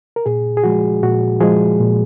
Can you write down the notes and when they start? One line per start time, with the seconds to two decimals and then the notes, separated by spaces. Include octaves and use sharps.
0.16 A#4
0.26 A#2 G#4
0.57 G#4
0.64 F3 G#3 F#4
1.03 A#2 F#4
1.41 F3 G#3 G#4
1.80 A#2